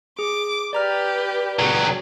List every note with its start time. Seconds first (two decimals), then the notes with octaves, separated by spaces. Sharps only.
0.19 G#4 D6
0.73 G4 B4 D5 A#5 F6
1.59 C#2 F#3